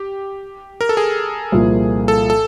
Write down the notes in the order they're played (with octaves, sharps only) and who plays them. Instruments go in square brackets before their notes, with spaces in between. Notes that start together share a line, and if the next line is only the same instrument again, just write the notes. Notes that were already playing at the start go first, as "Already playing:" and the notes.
Already playing: [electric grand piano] G4
A#4
A4
G#4
[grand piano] C2 A#2 F3 A#3
[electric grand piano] A4
A4